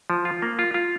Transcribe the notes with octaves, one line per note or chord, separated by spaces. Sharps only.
F3
F4
A#3
F4
F4